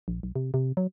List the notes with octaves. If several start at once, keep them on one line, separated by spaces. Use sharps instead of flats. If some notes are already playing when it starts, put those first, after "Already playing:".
A#1
B1
C3
C3
F#3